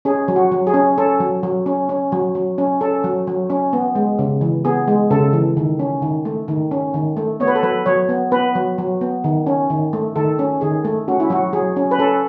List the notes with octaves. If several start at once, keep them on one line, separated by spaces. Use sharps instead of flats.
C#4 G#4
F#3
F#4
F#3
G#4
C#4
C#4 A4
F#3
F#3
C#4
C#4
F#3
F#3
C#4
C#4 A4
F#3
F#3
C#4
B3
G#3
C#3
E3
B3 G#4
G#3
C#3 A4
E3
D#3
C#4
D#3
A3
D#3
C#4
D#3
A3
B3 C#5
B4
A4
F#3 B4
F#3 C#5
B3
B3 B4
F#3
F#3
B3
D#3
C#4
D#3
A3
D#3 A4
C#4
D#3 G#4
A3
C#4 F#4
E4
F#3 F#4
F#3 G#4
C#4
B4
C#4 A4